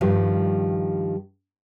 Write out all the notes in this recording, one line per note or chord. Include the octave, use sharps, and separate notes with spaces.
G2 D#3 F3 G3